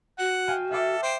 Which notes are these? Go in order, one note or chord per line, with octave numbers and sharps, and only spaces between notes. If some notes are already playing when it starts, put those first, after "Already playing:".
F#4 F#5
F5 G5 G#5
A4 E5 F5 D6
C5 G5